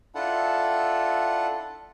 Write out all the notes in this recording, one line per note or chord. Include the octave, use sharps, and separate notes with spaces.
D4 E4 F4 A4 F#5 A5